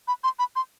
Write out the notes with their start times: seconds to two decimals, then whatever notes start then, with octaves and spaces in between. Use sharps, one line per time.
0.08 B5
0.24 C6
0.39 B5
0.56 C6